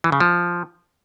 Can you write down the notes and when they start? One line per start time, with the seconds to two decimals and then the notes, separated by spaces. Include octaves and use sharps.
0.04 E3
0.12 C#3
0.20 F3